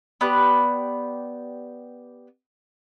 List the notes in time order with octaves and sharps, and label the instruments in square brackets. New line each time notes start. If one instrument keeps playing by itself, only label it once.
[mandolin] B3 G4 D5 F#6